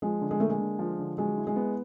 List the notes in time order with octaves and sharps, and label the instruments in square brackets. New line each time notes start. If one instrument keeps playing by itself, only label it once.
[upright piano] F3 [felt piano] G#3
[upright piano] D3
[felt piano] G#3
[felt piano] A3 [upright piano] A#3
[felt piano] G#3
[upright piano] D3
F3
D3
[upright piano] F#3 [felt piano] G#3
[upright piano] E4
[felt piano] G#3
[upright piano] B3